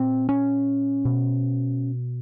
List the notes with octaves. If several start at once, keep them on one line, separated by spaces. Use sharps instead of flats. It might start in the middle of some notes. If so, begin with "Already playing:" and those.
Already playing: A#2 C4
C#4
B2